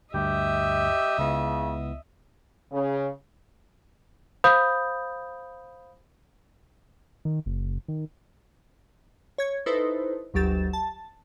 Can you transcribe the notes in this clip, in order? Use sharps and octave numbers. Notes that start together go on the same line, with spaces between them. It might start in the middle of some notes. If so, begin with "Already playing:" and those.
D2 G2 G4 D#5 E5
C#2 C#3 B3 E4
C#3
C5 F5 B5 D#6 G6
D#3
F#1
D#3
C#5 G#6
D#4 E4 A4 B4 C5
G1 D2 F#3 G4 A6 E7
A5